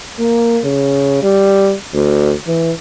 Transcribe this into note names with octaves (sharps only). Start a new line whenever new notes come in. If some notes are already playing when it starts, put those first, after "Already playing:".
A#3
C#3
G3
D2
E3